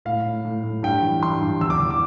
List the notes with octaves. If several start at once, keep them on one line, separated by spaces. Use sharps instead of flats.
A2 F5
A2
A2
A2
G2 G5
E3
G2 C6
G2
E2 E6
D6
E2
D6